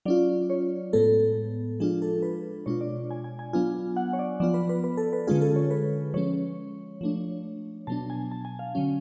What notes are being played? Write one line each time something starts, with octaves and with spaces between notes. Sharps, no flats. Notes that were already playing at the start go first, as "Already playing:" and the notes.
F#3 C#4 F4 D5
C#5
A2 G#3 B3 A4
F3 G#3 D4 F4 G#4
A4
B4
B2 G#3 D4 F4 C#5
D5
G#5
G#5
G#5
F#3 B3 D4 F4 G#5
F#5
C#5
D5
F3 B3 F4 D5
B4
B4
B4
A4
B4
D3 G#3 C#4 F4 G#4
A4
C#5
B4
F3 G#3 C#4 C#5
F3 A3 D4
B2 F#3 B3 D4 A5
G#5
A5
G#5
F5
D3 F#3 C#4